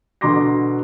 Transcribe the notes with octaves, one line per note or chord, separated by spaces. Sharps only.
B2 D3 A#5 C6 D6 A#6